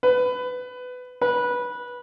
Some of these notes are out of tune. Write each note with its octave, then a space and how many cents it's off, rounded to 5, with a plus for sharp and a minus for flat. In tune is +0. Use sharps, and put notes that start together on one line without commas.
B4 +20
B4 -15